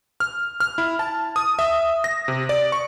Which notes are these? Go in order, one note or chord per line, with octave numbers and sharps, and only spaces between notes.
F6
F6
E4
A5
D#6
E5
A#6
C3
D5
C#6